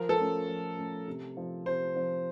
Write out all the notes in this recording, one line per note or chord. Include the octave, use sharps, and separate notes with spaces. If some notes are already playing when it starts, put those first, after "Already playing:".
Already playing: F3 A#4
A4
A3 C#4
F3
A3 C#4
C3
F3 C4
C3 C5
F3 C4